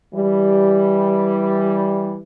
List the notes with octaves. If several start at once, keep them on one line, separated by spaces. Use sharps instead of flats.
E3 G3